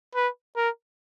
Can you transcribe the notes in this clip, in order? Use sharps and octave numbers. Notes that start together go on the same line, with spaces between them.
B4
A#4